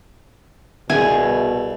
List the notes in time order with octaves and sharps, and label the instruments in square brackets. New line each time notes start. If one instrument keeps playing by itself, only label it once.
[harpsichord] C2 [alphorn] B2 [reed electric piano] G#4 E5 [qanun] G#5